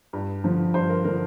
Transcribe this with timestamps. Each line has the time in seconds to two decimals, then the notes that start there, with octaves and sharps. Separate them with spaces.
0.13 G2
0.44 D3 F3
0.74 G2 C5
0.89 A#4
1.04 D3 F3 A#4